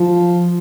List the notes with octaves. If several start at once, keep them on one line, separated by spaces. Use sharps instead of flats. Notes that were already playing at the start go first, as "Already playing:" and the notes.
Already playing: F3